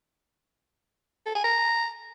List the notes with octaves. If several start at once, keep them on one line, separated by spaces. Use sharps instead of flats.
A4
G#5
A#5